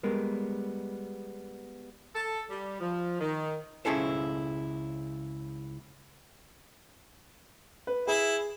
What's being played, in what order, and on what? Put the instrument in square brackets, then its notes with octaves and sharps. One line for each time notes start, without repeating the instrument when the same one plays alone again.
[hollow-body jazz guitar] G3 G#3 B3 A#4
[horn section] A4
G3
F3
D#3
[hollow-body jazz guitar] C#2 C#4 E4 G#4 A4 C5
[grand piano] B4
[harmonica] E4 [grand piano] G#4